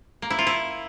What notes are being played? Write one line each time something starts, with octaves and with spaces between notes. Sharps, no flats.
A#3
E4
F4
E4